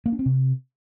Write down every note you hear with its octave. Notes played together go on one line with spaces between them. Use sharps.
A#3
D4
C4
C3